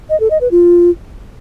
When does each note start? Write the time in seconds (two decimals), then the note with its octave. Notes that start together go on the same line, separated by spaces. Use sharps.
0.10 D#5
0.20 A4
0.31 D#5
0.41 B4
0.51 F4